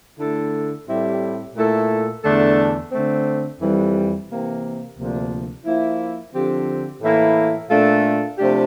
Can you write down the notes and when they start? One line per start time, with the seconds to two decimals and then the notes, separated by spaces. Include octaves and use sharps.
0.18 D3 A3 E4 A4
0.87 A2 G3 C4 E4 G4
1.55 A#2 A3 E4 A4
2.23 E2 D3 A3 D4 A4
2.92 D3 A3 C4
3.61 F2 E3 G3
4.28 C3 E3 A#3
4.97 D2 C3 F3 A#3 D4
5.64 F3 A#3 E4
6.33 D3 F3 C4 G4
7.02 A2 E3 A#3 E4
7.70 A#2 A3 D4 F4 A4
8.38 C3 F3 A3 D4 G4